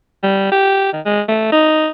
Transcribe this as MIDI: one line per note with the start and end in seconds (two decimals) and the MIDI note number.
0.23 0.47 55
0.52 0.92 67
0.93 1.01 51
1.05 1.22 56
1.29 1.49 57
1.52 1.89 63